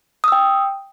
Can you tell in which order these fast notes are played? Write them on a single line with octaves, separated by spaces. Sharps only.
D#6 E6 G5